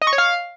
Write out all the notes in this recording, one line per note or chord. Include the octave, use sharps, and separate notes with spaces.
D#5
C#6
C#5
F5